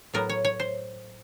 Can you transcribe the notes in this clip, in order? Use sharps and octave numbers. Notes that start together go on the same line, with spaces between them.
A2 F#3 B3 A#4
C#5
C#5
C5